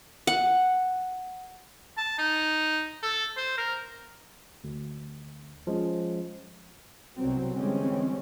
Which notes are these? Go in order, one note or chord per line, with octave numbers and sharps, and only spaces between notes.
F#5
A5
D#4
A4
C5
A#4
D2
F3 G#3 C#4
C2 B2 F#3 C4
D3 E3 G3 G#3 C4 C#4